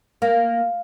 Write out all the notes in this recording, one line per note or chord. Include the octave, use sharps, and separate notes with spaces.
A#3